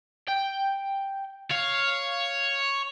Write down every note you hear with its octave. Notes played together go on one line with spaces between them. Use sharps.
G5
C#5 F5